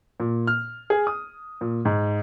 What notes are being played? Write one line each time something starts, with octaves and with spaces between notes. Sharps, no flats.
A#2
F6
G#4
D#6
A#2
G#2